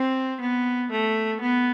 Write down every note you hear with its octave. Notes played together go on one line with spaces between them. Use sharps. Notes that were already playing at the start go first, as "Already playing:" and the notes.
Already playing: C4
B3
A3
B3